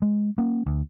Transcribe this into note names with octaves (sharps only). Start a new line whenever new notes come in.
G#3
A#3 C#4
D2